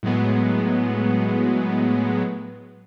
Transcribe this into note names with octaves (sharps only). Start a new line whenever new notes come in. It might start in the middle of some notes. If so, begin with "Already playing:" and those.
A2 F#3 G#3 B3